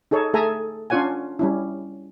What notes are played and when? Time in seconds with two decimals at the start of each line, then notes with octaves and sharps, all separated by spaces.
0.11 D#4 G#4 A4 C#5
0.34 A3 G#4 A4 E5 G#5 A#5
0.90 C#4 D4 F4 C#5 F#5 G#5
1.39 G3 C#4 E4